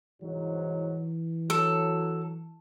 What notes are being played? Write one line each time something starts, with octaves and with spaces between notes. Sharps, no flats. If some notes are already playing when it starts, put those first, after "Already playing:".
C2 G#2 E3 F#3
F#3 A4